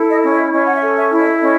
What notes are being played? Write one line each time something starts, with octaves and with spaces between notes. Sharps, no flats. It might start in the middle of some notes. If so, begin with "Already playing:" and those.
Already playing: E4 A4
D#5
C#4
D#5
C#4 D#5
F#5
E5
A4
E5
E4
D#5
C#4 D#5